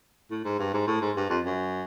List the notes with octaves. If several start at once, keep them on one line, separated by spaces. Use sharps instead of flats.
A2
G#2
G2
G#2
A2
G#2
G2
F2
F#2